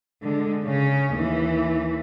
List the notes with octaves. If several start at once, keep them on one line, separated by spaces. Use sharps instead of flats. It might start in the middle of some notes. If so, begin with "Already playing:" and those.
D3 G#3
C#3 C#4
D#2 E3